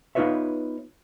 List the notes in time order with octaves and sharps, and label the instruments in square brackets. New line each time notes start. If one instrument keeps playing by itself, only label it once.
[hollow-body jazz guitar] B3 D#4 F4 B4 C#5 E5